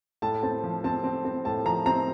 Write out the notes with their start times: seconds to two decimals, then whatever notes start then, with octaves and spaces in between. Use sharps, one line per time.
0.22 A2 A5
0.43 C4 A5
0.63 F3
0.84 C4 A5
1.04 C4
1.25 C4
1.45 A2 A5
1.65 F3 A#5
1.86 C4 A#5